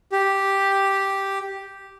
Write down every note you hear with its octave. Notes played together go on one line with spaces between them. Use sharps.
G4